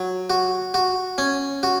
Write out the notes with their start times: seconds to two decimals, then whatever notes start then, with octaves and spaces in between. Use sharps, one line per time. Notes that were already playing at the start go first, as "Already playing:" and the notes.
Already playing: F#3
0.30 F#4
0.74 F#4
1.18 C#4
1.63 F#4